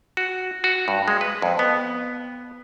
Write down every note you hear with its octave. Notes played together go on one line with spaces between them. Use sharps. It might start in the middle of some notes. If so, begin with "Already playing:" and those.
F#4
F#4
G2
G#3
B4
F2
B3